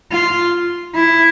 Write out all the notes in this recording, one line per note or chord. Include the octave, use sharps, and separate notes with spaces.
F4
E4